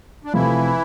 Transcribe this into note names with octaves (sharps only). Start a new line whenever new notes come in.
D4
F1 F2 C3 E3 F3 A3 E4